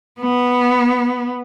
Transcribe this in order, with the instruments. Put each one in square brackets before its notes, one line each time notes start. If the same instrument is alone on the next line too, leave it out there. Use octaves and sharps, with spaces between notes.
[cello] B3